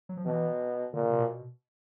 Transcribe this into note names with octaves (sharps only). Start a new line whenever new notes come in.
F#3
F3
B2 E3
A#2 D3
C#3
C3
B2